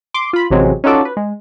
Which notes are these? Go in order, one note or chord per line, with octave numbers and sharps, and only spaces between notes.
C6 D6
F4 B5
A1 C3 F#3 G#3 C4
C#4 D#4 F4 F#4 A4 D5
B4
G#3